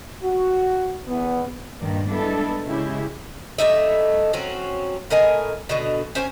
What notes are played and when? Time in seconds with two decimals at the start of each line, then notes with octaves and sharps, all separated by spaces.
0.23 F#4
1.08 E2 B3
1.79 G2 A#2 D#3 A#3 D5
2.07 G3 G#3 B3 D4 E4 A4
2.65 C#3 G#3 C#4 E4 G4
3.58 G3 A3 D#4 E5
4.33 F#3 C4 C#4 F#4
5.10 A2 A#4 D#5 G#5
5.69 B2 D3 F#4 D#5
6.15 C#4 C5 G5 G#5